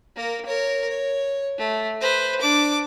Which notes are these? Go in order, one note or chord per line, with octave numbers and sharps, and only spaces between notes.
A#3 A#4
A#4 C#5
C#5
A3
B4 C5
D4 D6